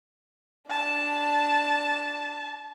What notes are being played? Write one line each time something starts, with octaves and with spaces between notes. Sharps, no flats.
D4 A5